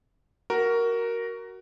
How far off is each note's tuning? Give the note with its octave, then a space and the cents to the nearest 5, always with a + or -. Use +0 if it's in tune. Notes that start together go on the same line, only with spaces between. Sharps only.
F#4 +15 A#4 +0